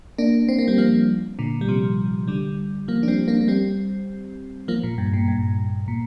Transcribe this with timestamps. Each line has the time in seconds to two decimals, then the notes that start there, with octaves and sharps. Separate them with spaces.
0.18 A#3 D4
0.49 C4
0.59 A#3
0.68 G3 C4
0.78 F3 A#3
1.39 A#2 D3
1.61 G3
1.68 C3 F3
2.28 D3 G3
2.88 F3 A#3
3.03 D4
3.08 G3 C4
3.28 A#3 D4
3.41 A#3
3.48 G3 C4
4.68 F3 A#3
4.83 A#2
4.98 G2
5.13 A#2
5.28 G2
5.88 A#2